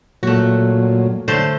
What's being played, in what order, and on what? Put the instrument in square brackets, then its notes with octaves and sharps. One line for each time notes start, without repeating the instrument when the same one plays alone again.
[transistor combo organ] A#2 F#3 [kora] A3 F#4
[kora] D3 A3 C5